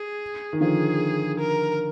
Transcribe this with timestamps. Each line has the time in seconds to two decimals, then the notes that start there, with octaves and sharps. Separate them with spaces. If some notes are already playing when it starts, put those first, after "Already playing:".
Already playing: G#4
0.53 D#3
0.60 D3 F3 G#4
1.39 A#4